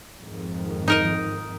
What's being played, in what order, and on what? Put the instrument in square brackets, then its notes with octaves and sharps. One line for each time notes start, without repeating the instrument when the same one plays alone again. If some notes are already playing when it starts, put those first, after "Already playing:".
[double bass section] F2 G#2 D#3
[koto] D#4 A#4 D#5